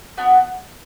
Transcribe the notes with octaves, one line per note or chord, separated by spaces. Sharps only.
B3 D4 F#4